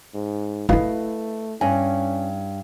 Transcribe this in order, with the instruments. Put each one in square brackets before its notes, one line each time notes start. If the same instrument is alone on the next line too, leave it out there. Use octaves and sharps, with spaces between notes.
[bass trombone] G#2
[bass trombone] A3 [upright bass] E4 F4 [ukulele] B4 D#5 F5
[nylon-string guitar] G2 [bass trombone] C#4 [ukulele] G#5